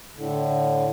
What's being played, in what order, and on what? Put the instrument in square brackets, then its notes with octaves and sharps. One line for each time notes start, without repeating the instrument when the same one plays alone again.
[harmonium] A2 D3